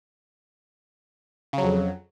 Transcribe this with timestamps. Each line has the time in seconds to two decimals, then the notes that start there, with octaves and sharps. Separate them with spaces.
1.53 C#3
1.58 F#3
1.63 F2